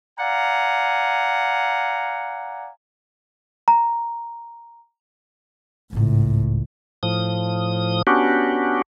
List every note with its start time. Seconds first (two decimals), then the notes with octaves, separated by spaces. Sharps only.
0.19 D5 F5 F#5 G#5 A#5
3.68 A#5
5.93 G#1 C#2 A2
7.03 A2 F3 D#6
8.07 B3 C#4 D4 F#4 G4